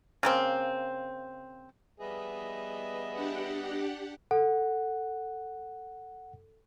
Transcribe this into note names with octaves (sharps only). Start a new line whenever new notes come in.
C#3 A#3 C4
G3 B3 G#4 B4 D#5 E5
D4 G4 F#5
A4 F#5